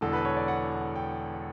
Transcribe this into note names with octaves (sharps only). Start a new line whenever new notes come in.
E1 E2 D3 A4
B4
C#5
D5
F#5
G5